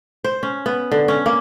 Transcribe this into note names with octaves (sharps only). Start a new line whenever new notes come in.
C5
C#4
B3
D3
C#4
A#3